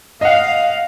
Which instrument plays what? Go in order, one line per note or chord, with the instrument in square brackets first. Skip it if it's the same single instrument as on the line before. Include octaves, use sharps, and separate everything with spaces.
[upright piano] D#5 F#5 [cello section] F5